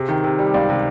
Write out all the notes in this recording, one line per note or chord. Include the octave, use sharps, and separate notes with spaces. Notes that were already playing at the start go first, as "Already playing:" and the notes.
Already playing: C3 G#4
D#3
C3
G3
C#2 D5
C3